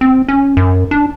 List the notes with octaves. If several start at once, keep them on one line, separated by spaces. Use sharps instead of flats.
C4
C#4
F#2
D4